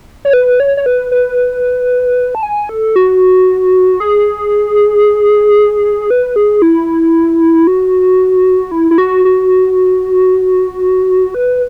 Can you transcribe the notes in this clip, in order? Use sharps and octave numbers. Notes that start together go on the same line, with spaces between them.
C#5
B4
C#5
C#5
B4
B4
A5
G#5
A4
F#4
G#4
B4
G#4
E4
F#4
E4
E4
F#4
F#4
B4